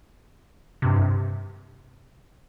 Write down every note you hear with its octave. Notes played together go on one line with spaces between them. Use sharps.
G2 C3